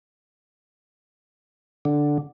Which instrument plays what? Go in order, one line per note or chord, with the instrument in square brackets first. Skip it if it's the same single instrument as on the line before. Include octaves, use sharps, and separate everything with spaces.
[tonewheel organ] D3